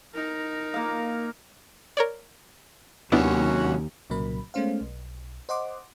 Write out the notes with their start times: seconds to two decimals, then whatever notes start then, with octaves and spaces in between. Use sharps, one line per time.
0.14 D#4 A#4
0.74 A#3 F5
1.97 A#4 C#5 D5
3.12 D#2 C3 F#3 B3 C#4 D4 E4 F#4
4.10 C2 A#2 C#3 F#3 A#4 B5
4.54 G#3 A3 B3 C#4 C5 F5
4.81 B1
5.49 C5 D#5 F#5 C6 D6